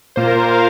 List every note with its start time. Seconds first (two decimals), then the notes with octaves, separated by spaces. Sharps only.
0.16 A#2 A#3 F4 C5
0.27 A#4
0.40 C5
0.51 F5